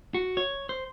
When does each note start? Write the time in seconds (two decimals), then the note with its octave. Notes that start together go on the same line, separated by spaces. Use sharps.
0.14 F#4
0.37 C#5
0.69 C5